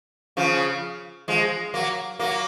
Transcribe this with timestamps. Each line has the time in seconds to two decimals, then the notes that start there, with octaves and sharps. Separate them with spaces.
0.37 C#3 F3
1.28 F3 G#3
1.74 F#3 A#3
2.19 F#3 A#3